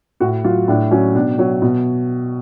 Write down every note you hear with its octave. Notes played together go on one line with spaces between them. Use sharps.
A2 F#4
F#3 F4
A2 D4
F#3 C#4
B2 D4
F#3 C#5
B2